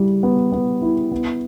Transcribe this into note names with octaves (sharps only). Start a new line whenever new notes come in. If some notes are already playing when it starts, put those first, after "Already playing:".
Already playing: G3 E4
B3
B3
E4
B3